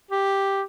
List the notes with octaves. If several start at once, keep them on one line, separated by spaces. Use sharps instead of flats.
G4